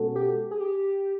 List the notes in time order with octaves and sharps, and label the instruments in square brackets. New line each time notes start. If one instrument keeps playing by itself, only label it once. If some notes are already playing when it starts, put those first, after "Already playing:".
Already playing: [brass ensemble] B2 G#3 C#4 F#4 A4
[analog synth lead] G4
G#4
G4